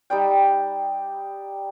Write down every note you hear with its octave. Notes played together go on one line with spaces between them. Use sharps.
G3 D#4 D5 G5